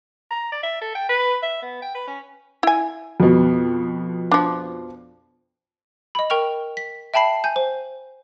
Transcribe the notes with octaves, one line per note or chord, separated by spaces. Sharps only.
A#5
D5
E5
A4
G5
B4
E5
B3
G5
B4
C#4
E4 G#5
F2 B2
F3 D4
D#5 B5
A#4 G5 C#6 F6 F7
B6
E5 G5 A5 B5 C7
G#5 G6
C5